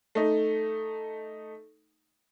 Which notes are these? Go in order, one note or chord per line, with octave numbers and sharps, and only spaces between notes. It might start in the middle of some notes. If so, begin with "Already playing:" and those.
A3 D#4